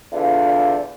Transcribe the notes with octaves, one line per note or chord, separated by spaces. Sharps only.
E2 D3 F4